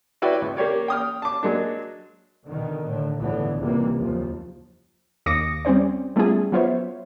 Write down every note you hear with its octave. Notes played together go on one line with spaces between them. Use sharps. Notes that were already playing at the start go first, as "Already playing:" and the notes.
E4 F#4 B4 D5 G5
C#2
A#3 G4 C#5 D5
G5 D#6 F6
A5 D6
F#3 G#3 A#3 D4
B2 D3 D#3
A2 D3
G1 C#2 A2 D3 E3 B3
C#2 C3 E3 G3 A#3
F#1 D#2 F3
D#2 D6 D#6 A#6 C#7
G3 C4 C#4 C5 D5
G3 A3 B3 C#4 F4 G#4
F#3 B3 F4 C5 C#5 E5